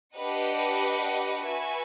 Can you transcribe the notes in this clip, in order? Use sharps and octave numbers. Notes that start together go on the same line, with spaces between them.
D4 G4 B4 D#5 F#5
F#4 B4 E5 G#5